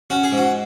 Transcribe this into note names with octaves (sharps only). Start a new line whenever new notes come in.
C#4 F#4
G#4
G#2
F#4